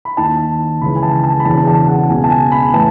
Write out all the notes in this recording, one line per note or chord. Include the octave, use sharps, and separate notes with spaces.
B5
D#2 D#3 A5
C#2 C#3 E3 B5
G#5
A5
A5
B5
E1 E2 C#3 E3 A5
A5
F#5
C#2 B2 G#5
A5
G#5
B5
A2 E3 A5